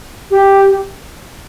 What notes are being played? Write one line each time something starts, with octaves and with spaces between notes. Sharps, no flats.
G4